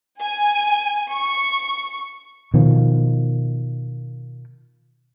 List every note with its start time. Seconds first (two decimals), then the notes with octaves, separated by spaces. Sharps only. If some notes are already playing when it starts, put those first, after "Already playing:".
0.21 G#5
1.11 C#6
2.54 B2 D#3 F3